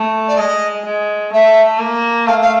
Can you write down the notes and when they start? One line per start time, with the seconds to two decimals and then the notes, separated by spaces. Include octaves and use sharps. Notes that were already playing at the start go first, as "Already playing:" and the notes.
Already playing: A3
0.27 D5
0.38 G#3 D#5
0.85 G#3
1.33 A3 E5
1.80 A#3
2.27 A3 F5
2.41 F5